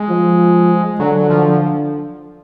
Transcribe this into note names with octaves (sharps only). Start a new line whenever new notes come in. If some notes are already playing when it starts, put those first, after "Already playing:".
Already playing: G#3
F3
D3 F#3
F3